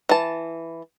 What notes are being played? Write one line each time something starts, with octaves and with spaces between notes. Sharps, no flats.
E3 A5